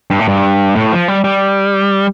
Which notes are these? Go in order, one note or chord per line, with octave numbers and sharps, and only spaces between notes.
G2
A2
G2
A2
F3
G3
G3